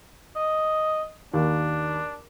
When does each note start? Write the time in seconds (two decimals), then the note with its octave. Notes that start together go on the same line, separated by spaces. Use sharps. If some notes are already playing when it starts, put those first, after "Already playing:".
0.36 D#5
1.34 D#2 D4